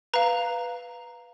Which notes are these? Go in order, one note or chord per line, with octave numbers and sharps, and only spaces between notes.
B4 F5 A#5